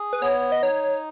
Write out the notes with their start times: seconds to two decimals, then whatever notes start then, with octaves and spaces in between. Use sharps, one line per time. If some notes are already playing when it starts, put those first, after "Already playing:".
Already playing: G#4
0.13 B4
0.22 B3 C#5
0.52 D#5
0.62 D#4 C#5